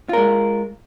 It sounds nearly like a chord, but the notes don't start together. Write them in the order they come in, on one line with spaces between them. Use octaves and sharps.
F4 A#4 G#3